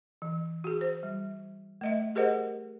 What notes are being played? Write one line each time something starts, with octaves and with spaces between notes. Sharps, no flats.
E3
F#4 G#4
C5
G3
A3 D#5 E5
G4 G#4 A#4 C5 D#5 F#5